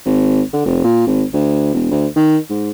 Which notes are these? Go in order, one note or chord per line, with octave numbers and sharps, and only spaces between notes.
G#1
D3
F1
A#2
G#1
D2
E1
D2
D#3
G#2